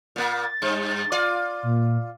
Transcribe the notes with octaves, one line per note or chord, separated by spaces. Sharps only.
A#2 A#3 A6
G2
F4 D5
A#2